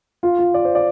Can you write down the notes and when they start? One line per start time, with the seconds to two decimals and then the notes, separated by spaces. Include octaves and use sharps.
0.23 F4
0.39 F4
0.54 D5
0.65 C5
0.75 D5